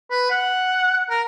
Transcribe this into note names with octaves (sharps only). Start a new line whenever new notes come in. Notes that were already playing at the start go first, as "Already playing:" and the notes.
B4
F#5
A#4